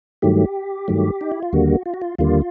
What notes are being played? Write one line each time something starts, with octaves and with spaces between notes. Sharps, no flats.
G2 D#3 F#3 A3 G4
G2 D#3 F#3 A3
D#4
E4
F4
D#2 D3 G3 A#3 F#4
F4
F#4
F4
D#2 D3 G3 A#3 F4